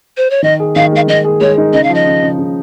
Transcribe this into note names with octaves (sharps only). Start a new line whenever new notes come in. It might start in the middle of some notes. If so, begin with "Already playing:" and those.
C5
C#5
D#3 D#5
G#4
D#3 F5
G#3 F5
D#3 D#5
G#4
G#3 C#5
D#4
C#3 D#5
F5
F3
D#5
C#3
C#3
C#3